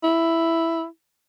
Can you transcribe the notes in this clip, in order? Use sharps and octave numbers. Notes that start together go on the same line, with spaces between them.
E4